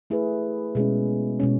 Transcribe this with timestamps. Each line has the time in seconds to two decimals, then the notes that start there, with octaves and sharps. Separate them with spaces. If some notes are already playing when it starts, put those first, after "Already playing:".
0.10 A3 E4 G#4 B4
0.75 B2 G#3 C#4
1.40 B2 G#3 C#4